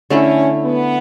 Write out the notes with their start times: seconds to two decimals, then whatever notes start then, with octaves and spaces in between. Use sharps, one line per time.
0.10 D3 A3 C#4 E4
0.64 B3